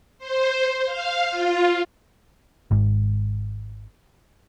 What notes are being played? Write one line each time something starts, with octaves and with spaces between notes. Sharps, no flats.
C5
F5
F4
G#1 G#2